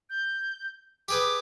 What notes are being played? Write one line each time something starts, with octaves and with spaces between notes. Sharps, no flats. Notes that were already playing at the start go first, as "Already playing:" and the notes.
G6
G4 G#4 B4 D6